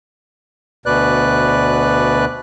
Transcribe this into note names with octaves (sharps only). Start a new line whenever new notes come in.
D2 B2 B4 D5 F#6